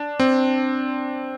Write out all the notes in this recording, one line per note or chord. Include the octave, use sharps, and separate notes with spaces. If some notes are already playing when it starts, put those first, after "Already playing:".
Already playing: D4
C4